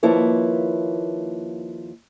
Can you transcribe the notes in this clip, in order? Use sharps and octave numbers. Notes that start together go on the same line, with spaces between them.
D#2 F3 A#3 E4 B4 C#5